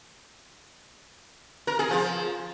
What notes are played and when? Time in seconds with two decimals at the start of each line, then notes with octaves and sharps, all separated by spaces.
1.67 A#4
1.79 G#4
1.91 F3